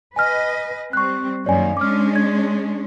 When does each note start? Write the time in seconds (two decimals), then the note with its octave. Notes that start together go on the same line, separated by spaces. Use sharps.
0.16 B4 D#5 G#5 F6
0.93 G3 C4 C#6 F#6
1.46 F#2 D#3 A#3 C#5 D5 G#5
1.77 G#3 C#4 D4 D6 F6
2.16 G#6